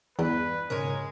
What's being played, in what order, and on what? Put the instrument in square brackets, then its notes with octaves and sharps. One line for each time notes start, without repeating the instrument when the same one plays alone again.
[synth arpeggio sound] E2 [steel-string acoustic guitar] G2 [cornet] B4
[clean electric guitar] B1 G#2 C#3 [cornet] G#3 [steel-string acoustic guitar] A#4 C#5 G#5